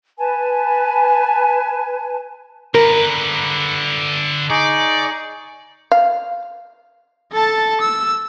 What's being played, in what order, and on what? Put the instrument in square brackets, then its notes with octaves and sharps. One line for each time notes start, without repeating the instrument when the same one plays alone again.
[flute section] B4 G#5 A5
[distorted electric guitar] D3 B4 [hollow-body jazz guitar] A#4
[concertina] D#4 G#4 C#6 [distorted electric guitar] D5
[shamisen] F5
[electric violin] A4 A5
E6